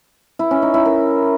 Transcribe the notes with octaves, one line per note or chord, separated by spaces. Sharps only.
E4
C#4
D#4
E4
A#4